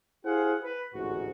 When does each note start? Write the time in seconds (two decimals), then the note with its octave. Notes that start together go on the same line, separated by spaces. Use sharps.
0.25 E4 G4 G#4 C5 F5 F#5
0.63 B4
0.95 A1 D2 G#2 F#4